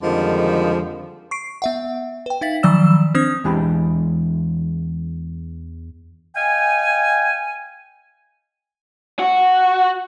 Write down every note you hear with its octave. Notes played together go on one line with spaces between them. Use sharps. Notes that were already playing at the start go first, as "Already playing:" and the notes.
F2 D3 D#3 F3 G3 G#3
C#6 C7 D7
B3 E5 F#5
B4 G5
D#4 E5 F5 A6 B6 F#7
D#3 F3 F#3 D5 E6 E7
C4 D4 C5 D#6
E2 E3 G#3 D4 G4 B5
D#5 F5 G5 G#5
F#4